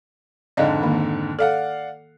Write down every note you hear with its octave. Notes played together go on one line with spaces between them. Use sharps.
F2 G#2 D3 D5 D#5 F5
D#3 A#3
A4 D5 F5 F#5